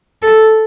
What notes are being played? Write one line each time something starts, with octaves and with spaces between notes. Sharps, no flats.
A4